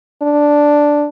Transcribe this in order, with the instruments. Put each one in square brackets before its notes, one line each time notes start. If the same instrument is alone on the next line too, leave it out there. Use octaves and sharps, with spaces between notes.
[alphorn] D4